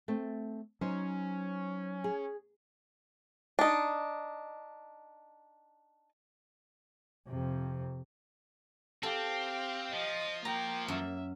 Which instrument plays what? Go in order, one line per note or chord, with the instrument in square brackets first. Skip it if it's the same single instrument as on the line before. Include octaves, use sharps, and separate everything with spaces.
[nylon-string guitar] A3 C4
[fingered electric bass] F#3 [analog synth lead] C#4 [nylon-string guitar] D#4 C5
[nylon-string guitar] G#4
[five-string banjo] D4 D#4
[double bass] F2 C3
[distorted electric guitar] C4 [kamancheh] G4 F5 [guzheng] A4
[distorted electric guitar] F3 [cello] D#5
[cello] A#3 [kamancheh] G5 [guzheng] A#5
[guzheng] F#2 [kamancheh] E5